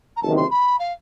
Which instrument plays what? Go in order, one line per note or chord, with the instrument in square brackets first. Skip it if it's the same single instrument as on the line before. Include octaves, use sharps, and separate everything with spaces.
[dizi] A#5
[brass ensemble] F#1 E2 C3 D#3 [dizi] A5
[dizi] C6
B5
F5